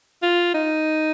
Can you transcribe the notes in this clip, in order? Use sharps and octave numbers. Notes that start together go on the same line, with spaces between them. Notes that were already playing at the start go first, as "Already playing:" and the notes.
F4
D#4